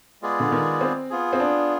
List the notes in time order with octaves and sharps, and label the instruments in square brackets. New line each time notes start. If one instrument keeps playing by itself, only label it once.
[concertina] G#3 B3 F4 G#4 D5
[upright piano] D3
D#3
C4
[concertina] B3 F4 G#4
[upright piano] C4
D4